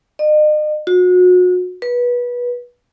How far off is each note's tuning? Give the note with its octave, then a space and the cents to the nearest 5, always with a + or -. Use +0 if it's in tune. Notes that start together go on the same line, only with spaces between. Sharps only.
D#5 -40
F#4 -35
B4 -25